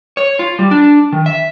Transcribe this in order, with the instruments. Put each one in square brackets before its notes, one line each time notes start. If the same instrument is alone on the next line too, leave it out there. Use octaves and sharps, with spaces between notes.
[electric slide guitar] C#5
F4
G3
D4
D#3
E5